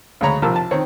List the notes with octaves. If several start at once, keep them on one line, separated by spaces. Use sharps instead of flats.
D2 C#3 G#3 C#5 A#5 B5
A#1 C3 A#4 A5 E6
A5
D#3 C4 C#5